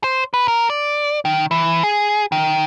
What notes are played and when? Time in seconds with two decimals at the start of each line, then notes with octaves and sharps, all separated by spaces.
0.04 C5
0.34 B4
0.48 A#4
0.70 D5
1.25 D#3
1.51 E3
1.84 G#4
2.32 D#3